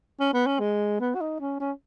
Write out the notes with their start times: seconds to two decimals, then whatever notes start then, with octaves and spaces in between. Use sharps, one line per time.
0.20 C#4
0.33 B3
0.47 C#4
0.60 G#3
1.00 B3
1.15 F#4
1.20 D#4
1.40 C#4
1.60 C#4